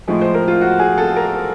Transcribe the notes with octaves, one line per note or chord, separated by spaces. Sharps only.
A2 F3 G#3
C5
A#4
F4
F#4
G#4
A4
A#4